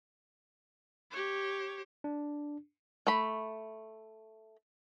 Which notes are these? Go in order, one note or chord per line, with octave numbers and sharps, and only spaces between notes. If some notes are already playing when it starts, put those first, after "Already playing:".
G4 C#5
D4
A3 B5